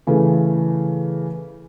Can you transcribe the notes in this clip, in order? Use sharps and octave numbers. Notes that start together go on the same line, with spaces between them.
C#3 E3 A3